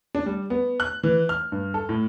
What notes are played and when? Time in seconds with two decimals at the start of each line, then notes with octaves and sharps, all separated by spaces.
0.15 D4
0.26 G3
0.50 B3
0.80 F#6
1.03 E3
1.29 F6
1.52 G2
1.74 A4
1.89 A2